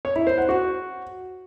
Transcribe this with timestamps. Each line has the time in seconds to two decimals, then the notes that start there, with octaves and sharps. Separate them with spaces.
0.05 C#5
0.16 E4
0.27 C5
0.38 F#5
0.49 F#4